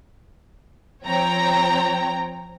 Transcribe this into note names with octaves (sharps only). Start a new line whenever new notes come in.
F3 C4 C#5 G5 A#5